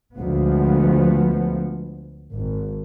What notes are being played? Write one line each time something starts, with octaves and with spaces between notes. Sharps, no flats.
D2 F3 G#3 B3
G#1